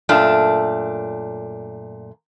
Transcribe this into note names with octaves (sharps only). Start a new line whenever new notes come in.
F#2 A#2 A3 D4